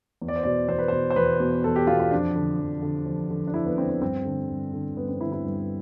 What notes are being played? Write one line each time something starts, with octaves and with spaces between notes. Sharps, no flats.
E2
D5
C5
B2 D5
E2 C5
B4
B2 C5
C5
E2 B4
B2
E2 A4
G4
B2 F4
F4
F2 D4
D3
F2
D3
F2
D3
D4
F2 E4
B3
D3 C4
C4
G2 C4
D3
G2
D3
G2 B3
C4
D3 E4
E4
G2